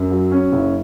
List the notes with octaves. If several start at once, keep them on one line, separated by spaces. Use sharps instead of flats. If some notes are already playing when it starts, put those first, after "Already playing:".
Already playing: F#2
F#3
C#4
F#1